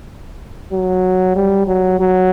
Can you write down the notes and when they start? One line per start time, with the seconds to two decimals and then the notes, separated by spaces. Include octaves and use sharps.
0.72 F#3
1.36 G3
1.67 F#3
1.99 F#3